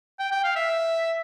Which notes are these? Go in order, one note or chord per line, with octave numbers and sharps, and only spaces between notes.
G5
G5
F5
E5